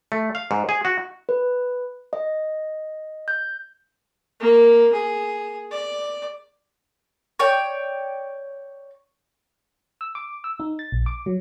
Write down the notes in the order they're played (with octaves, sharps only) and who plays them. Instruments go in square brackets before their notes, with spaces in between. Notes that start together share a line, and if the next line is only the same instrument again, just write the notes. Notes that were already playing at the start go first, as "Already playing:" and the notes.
[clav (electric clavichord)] A3
F5
G#2
G#4
F#4
[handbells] B4
D#5
G6
[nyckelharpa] A#3
G#4
D5
[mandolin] C#5 D5 G5
[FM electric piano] E6
D6
E6
D#4
A6
A#1
D6
F#3